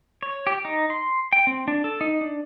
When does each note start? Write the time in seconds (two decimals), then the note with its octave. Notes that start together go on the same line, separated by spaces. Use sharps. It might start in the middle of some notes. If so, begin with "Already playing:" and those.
0.23 C#5
0.47 G4
0.65 D#4
0.90 C6
1.33 G5
1.47 C4
1.68 D4
1.84 A4
2.01 D#4
2.21 D4